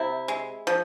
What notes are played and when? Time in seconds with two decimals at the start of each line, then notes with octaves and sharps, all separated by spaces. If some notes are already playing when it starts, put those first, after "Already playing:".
Already playing: C3 E4
0.28 G#3
0.67 F3